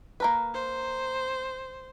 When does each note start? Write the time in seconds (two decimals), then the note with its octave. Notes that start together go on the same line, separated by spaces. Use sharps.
0.20 A#3 A#4 B4
0.54 C5